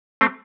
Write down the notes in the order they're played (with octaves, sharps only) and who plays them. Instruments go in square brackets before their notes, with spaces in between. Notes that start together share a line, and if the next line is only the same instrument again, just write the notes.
[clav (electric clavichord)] A3 C4